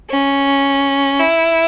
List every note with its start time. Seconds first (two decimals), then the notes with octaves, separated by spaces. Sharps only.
0.10 C#4
1.20 E4